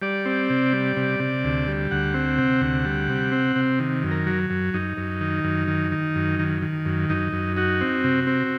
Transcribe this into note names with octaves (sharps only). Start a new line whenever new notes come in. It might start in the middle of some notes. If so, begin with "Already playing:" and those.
G3 D5
C4
C3
G3
C3
C3
D2
G3
D2 F#5
C4
C3
D2
G3
C3
C4
C3
D#3
F#2
A#4
F#3
F#2
F#2 D#4
F#2
D#3
F#2
D#3
D#3
F#2
D#3
D#3
F#2
F#2 D#4
F#2
D#4 F#4
C4
C3
C4